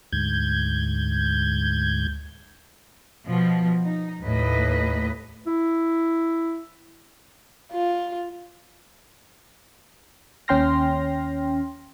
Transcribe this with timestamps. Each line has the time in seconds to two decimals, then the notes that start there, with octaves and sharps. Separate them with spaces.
0.13 D2 G#2 G6 G#6
3.28 B2 F3
3.83 D#4
4.21 D#2 A2 B4 D#5
5.47 E4
7.72 F4
10.48 D#2 C#4 G5 C6 F6 A#6